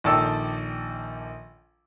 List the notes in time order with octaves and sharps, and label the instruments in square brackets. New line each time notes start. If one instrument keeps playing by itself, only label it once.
[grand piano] A#1 D#3 A4 D5 G5 E6